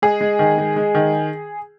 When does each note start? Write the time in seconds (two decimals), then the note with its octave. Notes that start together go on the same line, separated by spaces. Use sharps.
0.02 G#3 G#4
0.21 G#3
0.39 D#3
0.58 G#3
0.76 G#3
0.95 D#3